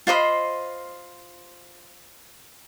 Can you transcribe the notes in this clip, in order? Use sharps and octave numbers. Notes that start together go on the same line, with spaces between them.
F4 C5 D#5 B5